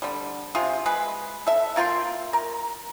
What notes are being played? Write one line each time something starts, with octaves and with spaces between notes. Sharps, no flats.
D3 G3
C3 F4 G#4
G#3 G#4 B4
A4 E5
A#3 F4 G5 C6
A#4